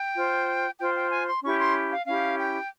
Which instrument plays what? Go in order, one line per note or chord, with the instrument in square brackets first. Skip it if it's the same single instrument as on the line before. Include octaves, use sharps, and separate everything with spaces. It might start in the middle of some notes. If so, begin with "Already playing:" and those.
Already playing: [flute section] G5
F4 C5
F4 C5 G5
G5
G#5
C6
C#4 E4 G4 C#6
C6
F5
C#4 E4 G4 F5
G5